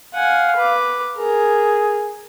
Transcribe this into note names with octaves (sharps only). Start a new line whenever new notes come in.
F5 F#5 G#5
B4 D6
G#4 A#4